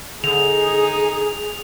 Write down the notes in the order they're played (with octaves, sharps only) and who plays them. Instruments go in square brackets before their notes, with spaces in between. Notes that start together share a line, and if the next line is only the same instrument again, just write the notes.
[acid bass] D3 [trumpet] D#4 [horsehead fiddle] G#4 [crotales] F7